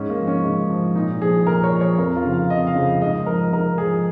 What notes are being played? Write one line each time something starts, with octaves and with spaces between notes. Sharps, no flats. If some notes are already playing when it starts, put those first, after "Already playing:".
Already playing: G#2 C#4
A#3
F3
C#4
G#2
F3
A#2 D#4
F3 G#4
A#2 A#4
C#5
F3
C#5
F2 A#4
F4
C#3 F3
F5
F2 D#5
F5
C#3 F3
G#2 D#5
F3 A#4
G#2 A#4
F3 G#4